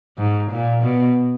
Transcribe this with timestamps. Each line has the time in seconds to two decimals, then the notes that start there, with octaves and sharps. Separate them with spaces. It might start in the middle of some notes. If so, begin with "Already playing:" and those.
0.18 G#2
0.51 A#2
0.82 B2